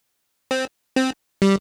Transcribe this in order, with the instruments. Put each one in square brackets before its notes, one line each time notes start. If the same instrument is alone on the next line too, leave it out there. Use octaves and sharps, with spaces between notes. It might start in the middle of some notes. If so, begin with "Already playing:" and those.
[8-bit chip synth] C4
C4
G3